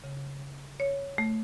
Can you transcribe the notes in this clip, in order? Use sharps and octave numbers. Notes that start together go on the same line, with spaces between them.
C#3
C#5
A3